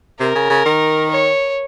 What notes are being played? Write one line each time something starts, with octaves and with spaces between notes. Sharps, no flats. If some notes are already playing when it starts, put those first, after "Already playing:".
C3 A#4
C#3
C#3
D#3
C#5